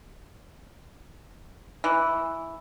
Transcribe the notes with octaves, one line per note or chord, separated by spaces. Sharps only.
E3